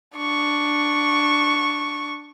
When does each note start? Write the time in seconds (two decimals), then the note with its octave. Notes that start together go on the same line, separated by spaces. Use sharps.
0.16 D4 C#6